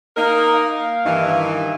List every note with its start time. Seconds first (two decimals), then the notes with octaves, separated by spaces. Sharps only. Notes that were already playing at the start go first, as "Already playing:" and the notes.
0.17 A#3 D#4 A#4
0.55 F5
1.05 G2 D#3 E3